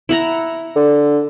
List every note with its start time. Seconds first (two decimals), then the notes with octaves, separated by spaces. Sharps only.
0.09 E4 F#5 A#5
0.75 D3